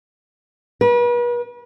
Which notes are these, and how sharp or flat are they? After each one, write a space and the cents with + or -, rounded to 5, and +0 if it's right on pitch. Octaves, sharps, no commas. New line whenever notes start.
B4 -40